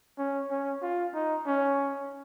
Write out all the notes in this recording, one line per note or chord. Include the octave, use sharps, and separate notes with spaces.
C#4
C#4
F4
D#4
C#4